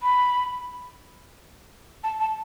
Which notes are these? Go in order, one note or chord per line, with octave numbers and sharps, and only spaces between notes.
B5
A5
A5